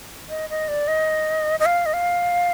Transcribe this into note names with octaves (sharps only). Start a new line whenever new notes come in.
D#5
D#5
D5
D#5
D#5
F5
D#5
F5